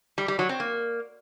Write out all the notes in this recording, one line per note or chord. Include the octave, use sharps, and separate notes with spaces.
G3
G3
F#3
C4
A#3